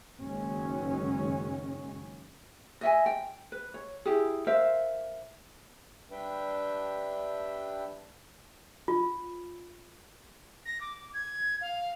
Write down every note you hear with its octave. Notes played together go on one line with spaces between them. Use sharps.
F#1 D#3 F#3 G#3 C#4
D#5 E5 G#5
G5
B4
C#5
E4 G4 G#4
A#4 C5 E5 F5
G3 D4 B4 E5 G5
F4
A#6
D6
G#6
F5